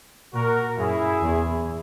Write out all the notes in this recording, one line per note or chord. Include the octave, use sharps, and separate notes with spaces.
A#2 F#4 A#4
F#2 E4 G#4
E2